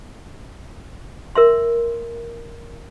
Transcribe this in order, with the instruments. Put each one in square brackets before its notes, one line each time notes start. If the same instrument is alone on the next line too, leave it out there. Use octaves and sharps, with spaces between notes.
[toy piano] A#4 E5 C6